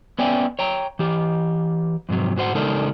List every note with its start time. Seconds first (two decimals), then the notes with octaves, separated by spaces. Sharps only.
0.19 B3 C#4 D5 E5 G5 G#5
0.59 C#5 G5 A#5
0.99 E3 G4
2.09 F2 G#2 C3 F#3
2.36 G#2 F#4 C5 F#5
2.55 C#3 G#3 D4 D#4 A4 A#4